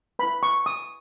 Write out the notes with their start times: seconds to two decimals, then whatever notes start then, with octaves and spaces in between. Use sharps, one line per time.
0.19 E4 B4 B5
0.43 C#6
0.66 D#6